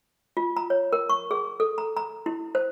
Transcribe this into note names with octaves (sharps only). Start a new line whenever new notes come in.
F4
A#5
C#5
A#4
C#6
G#4
A4
A#5
A#5
E4
C5